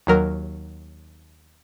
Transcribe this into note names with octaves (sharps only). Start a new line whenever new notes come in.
D#2 F#3 A#4